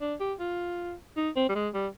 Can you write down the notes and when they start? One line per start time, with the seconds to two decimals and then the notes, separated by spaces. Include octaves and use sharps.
0.01 D4
0.20 G4
0.40 F4
1.17 D#4
1.36 C4
1.49 G3
1.55 G#3
1.74 G3